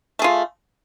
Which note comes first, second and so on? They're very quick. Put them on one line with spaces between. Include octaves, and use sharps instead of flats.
A3 G#4 F4